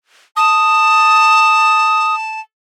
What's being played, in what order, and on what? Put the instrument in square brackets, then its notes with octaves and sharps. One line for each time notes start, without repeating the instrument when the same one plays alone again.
[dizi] A5 [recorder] D#6